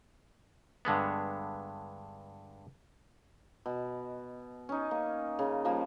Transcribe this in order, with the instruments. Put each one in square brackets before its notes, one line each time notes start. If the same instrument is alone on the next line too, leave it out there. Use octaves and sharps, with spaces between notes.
[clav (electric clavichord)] G2 D3 G#3 B3
[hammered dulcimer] B2
C#4 D#4
A#3
C#3
F3 G3 A#3